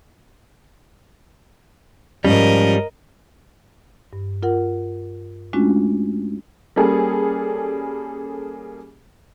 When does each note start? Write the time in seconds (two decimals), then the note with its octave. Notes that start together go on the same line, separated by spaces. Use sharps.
2.25 G#2 F3 G3 C#4 A#4 D#5
4.13 G2
4.43 F4 A#4 F#5
5.53 G#3 A3 C#4 D4 F4 F#4
6.76 G3 A#3 C#4 G#4 A4